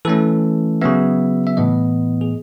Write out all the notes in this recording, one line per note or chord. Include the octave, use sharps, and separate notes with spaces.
E3 A3 C#4 A4
C#3 F#3 B3 E5
E5
A2 E3 B3 D#5
G#4